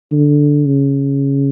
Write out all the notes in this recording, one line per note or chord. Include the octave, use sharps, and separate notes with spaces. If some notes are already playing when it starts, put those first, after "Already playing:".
D3
C#3